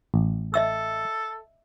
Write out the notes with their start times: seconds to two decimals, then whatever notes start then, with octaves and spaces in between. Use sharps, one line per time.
0.14 A1
0.54 A4 D#5 E5 E6